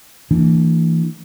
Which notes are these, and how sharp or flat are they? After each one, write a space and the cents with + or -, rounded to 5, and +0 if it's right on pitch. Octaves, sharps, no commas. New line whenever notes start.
E3 +0 A#3 -45 D4 +0